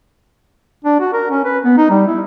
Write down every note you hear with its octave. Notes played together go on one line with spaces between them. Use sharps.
D4
F#4
A#4
C#4
B4
B3
D#4
G3
E4